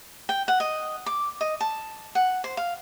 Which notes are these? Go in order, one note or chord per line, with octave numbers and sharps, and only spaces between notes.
G5
F#5
D#5
D6
D#5
A5
F#5
C5
F5